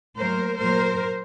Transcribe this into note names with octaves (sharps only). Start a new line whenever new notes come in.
A2 F#3 A#3 A#4 C5
A#2 F#3 A#3 A#4 C5